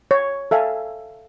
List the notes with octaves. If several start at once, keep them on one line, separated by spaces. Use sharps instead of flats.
C#5
A4 E5 F5 G#5